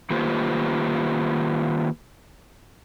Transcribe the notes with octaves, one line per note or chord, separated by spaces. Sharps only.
D#3 A#3 F4 G4 B4 C5